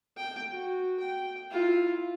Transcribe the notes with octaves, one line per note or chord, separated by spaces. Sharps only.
G5
F#4
G5
E4 F4